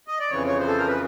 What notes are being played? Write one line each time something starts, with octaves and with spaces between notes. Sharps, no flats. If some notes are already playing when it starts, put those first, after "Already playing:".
D#5
D5
F2 C#3 E3 C#5
C#5
C5
A4
A#4
B4